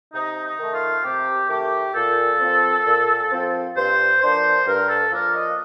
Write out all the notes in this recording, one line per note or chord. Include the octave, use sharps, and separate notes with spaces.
C3 D#4
D#4
D#3 A3
F4
C3 G4
D#3 A3 G4
A#2 A4
F3 C4
A#2
F3 C4
G2 C5
F3 A#3 D4 C5
G2 A#4
A4
F3 A#3 D4 A#4
D#5